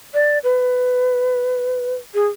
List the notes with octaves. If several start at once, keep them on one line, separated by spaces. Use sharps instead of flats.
D5
B4
G#4